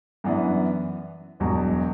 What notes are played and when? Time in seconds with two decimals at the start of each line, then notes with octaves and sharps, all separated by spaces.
0.24 F#2 E3 B3 D4
1.40 E1 E2 B2 F#3